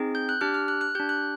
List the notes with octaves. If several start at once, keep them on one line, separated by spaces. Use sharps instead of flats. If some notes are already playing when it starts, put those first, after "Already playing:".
Already playing: C4 D#4 G#4
G6
F#6
D4 G4 F6
F6
F#6
F#6
D4 G4 G6
F#6